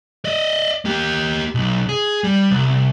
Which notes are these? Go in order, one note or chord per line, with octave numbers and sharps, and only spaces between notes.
D5 D#5
A#3 G4
B1
G#4
G3
C2